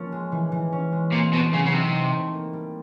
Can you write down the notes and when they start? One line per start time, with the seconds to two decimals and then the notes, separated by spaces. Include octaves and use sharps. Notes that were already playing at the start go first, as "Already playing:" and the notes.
Already playing: F3 A#3 C#4
0.12 G#3
0.32 E3
0.52 E3
0.72 C#4
0.92 G#3
1.12 A#2 C4
1.33 B2 A3
1.53 C#3 F#3
1.66 C#3
1.72 C3 D#4
1.93 C4
2.13 A3
2.34 A#3
2.53 G3